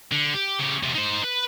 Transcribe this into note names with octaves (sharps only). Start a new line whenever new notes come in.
D3
G4
C#3 G4
E2 C3
D#4 C5
B4